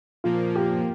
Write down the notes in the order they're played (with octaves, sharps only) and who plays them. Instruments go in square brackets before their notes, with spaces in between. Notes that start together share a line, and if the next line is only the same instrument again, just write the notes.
[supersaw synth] A#2 F3 A#3 [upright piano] F4
[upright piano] G4